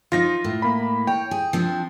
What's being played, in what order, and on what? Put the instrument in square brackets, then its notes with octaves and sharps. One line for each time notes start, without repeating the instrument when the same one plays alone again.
[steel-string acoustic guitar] F3 D#4 [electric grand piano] F4 A#6
[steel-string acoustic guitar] A2
[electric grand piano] A#3 B5
[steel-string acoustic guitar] C#5 [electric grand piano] G5
[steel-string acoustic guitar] G#4
F3 C4 D4